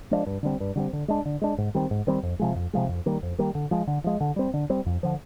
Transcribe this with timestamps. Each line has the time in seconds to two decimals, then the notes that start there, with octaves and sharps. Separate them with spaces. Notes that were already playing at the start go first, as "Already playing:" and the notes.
0.11 F3 G#3 D4
0.26 G2
0.43 D3 G3 C4
0.60 G2
0.76 D3 G3 C4
0.93 D3
1.08 G#3 D4
1.25 D3
1.42 G#3 D4
1.58 G#2
1.75 D#3 G3 C4
1.91 G#2
2.07 D#3 G3 C4
2.23 F2
2.39 C3 F3 G#3
2.56 F2
2.73 C3 F3 G#3
2.89 F2
3.06 D#3 G3 A#3
3.23 F2
3.38 D#3 G3 A#3
3.55 D3
3.71 F3 G#3
3.87 D3
4.04 F3 G#3
4.21 D3
4.36 G3 C4
4.54 D3
4.70 G3 C4
4.86 F2
5.03 D3 F3